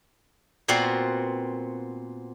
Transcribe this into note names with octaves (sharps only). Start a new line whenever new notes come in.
A#2 B3 C4 F#4 F5